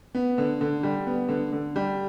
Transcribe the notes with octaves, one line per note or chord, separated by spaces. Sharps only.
B3
D3
D3
G3
B3
D3
D3
G3